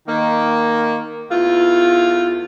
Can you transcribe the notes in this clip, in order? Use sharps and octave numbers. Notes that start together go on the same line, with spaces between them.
D#3 A#3
E2 A3 F4